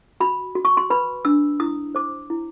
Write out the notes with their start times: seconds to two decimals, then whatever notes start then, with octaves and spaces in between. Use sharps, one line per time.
0.20 F#4 B5
0.55 F#4
0.65 C#6
0.77 C6
0.90 B4 B5
1.25 D4 E6
1.60 E4 D#6
1.95 C5 D6
2.30 E4